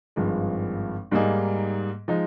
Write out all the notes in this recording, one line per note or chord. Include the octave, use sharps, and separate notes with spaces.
G#1 G2 F3 G#3
G#2 G3 A#3 D#4 G#4
F3 G#3 D#4